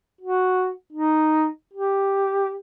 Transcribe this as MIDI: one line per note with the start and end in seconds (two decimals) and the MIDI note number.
0.21 0.70 66
0.93 1.47 63
1.74 2.54 67